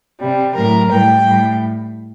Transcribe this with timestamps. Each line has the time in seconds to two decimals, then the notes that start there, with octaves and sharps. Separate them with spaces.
0.19 C3 G3
0.55 A2 F#3 A#4
0.91 A2 G3 G5
1.26 A2 G3